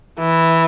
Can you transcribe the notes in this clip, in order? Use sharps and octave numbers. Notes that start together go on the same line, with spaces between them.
E3